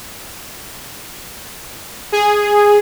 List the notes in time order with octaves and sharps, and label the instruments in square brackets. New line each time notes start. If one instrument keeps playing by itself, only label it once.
[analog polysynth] G#4